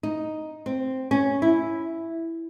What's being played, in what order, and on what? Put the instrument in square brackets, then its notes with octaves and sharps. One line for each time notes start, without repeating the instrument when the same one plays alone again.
[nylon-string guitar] D#4
C4
C#4
E4